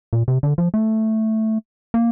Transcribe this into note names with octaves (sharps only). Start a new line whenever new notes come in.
A#2
C3
D3
F3
A3
A#3